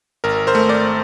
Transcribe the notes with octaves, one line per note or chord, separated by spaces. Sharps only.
G#1 A#4
A#4 C5
A3
C5 D5